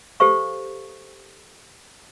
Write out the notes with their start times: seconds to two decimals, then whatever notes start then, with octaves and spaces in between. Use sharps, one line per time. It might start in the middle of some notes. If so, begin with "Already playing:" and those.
0.20 G4 A4 C5 F5 C#6